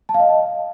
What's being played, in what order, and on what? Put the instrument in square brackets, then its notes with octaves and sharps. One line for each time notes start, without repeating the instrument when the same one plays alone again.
[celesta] A5
F5
D#5